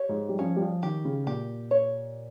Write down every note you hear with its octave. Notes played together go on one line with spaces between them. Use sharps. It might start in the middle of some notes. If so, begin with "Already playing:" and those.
Already playing: G4 C#5
G#2
G3
F3 C#4
G3
F3
D#3 G4
C#3
A#2 G4
C#5